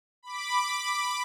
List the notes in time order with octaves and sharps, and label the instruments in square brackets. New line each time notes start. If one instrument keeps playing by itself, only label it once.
[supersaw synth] B5 D6